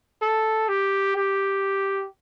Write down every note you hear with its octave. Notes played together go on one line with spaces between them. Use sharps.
A4
G4
G4